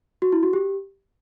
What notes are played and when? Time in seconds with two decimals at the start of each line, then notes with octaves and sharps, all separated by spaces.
0.22 F#4
0.32 E4
0.43 F#4
0.53 G4